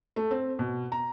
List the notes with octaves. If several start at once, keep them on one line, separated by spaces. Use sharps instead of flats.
A3
C4
B2
A#5